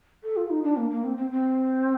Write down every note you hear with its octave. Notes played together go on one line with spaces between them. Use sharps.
A4
F4
D#4
D4
A#3
A#3
C4
C4
C4